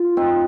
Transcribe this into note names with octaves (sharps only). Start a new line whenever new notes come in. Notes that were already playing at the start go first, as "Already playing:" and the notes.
Already playing: F4
C4 D#4